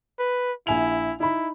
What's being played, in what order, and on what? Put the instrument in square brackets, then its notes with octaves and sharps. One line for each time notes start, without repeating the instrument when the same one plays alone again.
[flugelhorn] B4
[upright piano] A#1 G#5 F7 [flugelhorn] E4
[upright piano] D#4 B5 [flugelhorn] E4